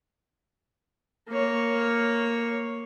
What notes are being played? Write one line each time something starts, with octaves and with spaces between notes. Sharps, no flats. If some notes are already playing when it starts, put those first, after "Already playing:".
A#3 C#5